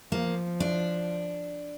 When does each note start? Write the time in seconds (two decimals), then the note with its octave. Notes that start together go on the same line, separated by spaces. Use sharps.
0.11 F3 A#3
0.60 D4